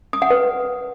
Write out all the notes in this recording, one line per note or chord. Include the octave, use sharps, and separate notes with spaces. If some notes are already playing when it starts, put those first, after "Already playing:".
D#6
F#5
B4